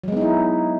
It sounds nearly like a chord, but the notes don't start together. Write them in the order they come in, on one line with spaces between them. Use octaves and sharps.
F#3 G#3 B3 D#4 E4